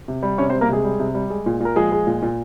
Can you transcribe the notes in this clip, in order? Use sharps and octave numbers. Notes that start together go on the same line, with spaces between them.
C3
G3
C3 C#4 C#5
C4 C5
G3
A#3 A#4
C3 G#3 G#4
G3
C3
G3
G#3
A#2
A#2 A#4
F3 G#3 G#4
G#3
A#2
A#2